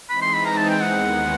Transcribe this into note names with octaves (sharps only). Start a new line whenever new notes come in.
E3 G#3 C4 D#4 B5
C6
B5
A#5
A5
G5
D#2 D#3 G#3 B3 F#5